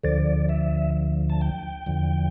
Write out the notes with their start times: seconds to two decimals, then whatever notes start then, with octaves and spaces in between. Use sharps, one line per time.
0.04 D2 D3 F3 D5
0.49 E5
1.30 A5
1.41 G5
1.86 E2 D3 F3